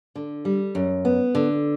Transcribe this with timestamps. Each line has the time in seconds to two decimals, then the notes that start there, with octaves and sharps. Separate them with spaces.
0.15 D3
0.45 G3
0.75 F#2
1.05 B3
1.35 D3